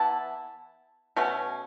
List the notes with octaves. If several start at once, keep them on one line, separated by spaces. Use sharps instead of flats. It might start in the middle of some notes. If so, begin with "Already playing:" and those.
Already playing: E3 B3 E4 A5
B2 A3 C#4